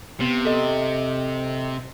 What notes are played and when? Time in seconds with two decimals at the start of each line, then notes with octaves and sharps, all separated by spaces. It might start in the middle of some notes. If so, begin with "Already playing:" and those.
0.20 C3 B3
0.45 A4 D#5